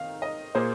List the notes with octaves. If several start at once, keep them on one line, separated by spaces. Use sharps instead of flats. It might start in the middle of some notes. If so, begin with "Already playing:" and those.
Already playing: D#3 C4 D#4 F5
D#5
A#2 A#3 G#4 C5